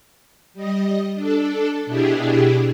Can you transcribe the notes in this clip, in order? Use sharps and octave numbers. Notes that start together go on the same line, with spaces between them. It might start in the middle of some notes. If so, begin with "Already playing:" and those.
G3 D#5
D4 A4
B2 D4 E4 G4 G#4